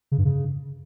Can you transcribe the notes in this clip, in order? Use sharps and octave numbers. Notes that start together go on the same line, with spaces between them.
C#3
G2
C#3